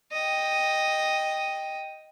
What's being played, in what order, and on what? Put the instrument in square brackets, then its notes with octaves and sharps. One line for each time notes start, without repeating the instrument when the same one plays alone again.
[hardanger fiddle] D#5 G5